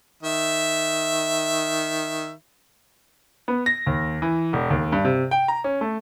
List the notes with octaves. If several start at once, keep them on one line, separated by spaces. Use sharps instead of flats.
D#3 E5
B3
A#6
D#2
E3
E1
D#2
G2
C3
G5
A#5
C#4
A3